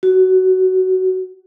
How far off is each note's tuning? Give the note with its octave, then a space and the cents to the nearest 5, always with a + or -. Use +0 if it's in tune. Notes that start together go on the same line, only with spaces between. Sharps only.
F#4 +15